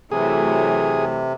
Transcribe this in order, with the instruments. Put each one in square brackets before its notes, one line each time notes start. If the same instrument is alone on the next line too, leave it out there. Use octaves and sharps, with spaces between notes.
[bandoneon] C3 [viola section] E3 F#3 A3 [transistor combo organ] G#4